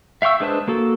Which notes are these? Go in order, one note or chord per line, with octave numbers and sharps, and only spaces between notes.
E5 F5 G5 C#6 E6
G#3 D4 B4 C5 A5
A#3 F#4 A4